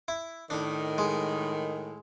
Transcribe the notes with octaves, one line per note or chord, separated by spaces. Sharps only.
E4
A2 D#3 D4
G#3